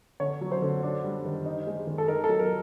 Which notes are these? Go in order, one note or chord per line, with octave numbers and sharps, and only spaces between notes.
D3 C#5
F#3
C5
D3
D4
G3
D#3
D#4
G#3
D#3
A4
D#4 A#4
A4
F#3
A#4